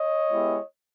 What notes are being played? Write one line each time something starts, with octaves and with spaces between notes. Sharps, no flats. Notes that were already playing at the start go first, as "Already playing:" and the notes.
Already playing: C#5 D#5
G#3 B3 E4 G4